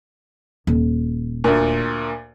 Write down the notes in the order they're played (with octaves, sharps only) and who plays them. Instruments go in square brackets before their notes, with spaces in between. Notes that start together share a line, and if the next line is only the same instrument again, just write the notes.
[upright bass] D#1
[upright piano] D2 A#2